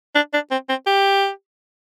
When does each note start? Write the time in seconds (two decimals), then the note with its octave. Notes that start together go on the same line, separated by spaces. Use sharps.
0.15 D4
0.33 D4
0.51 C4
0.69 C4
0.86 G4